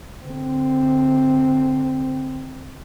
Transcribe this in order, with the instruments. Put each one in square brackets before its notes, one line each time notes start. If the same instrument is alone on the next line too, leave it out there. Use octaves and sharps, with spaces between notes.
[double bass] D3 C4